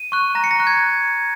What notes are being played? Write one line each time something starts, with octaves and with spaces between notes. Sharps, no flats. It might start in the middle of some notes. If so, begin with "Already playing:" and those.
Already playing: D#7
C#6 F#6
A#5 A#6
C#7
A#6
C#6 F#6
G#6